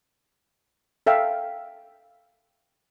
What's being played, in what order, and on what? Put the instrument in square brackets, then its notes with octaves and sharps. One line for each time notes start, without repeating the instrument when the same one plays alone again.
[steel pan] A4 E5 F5 G5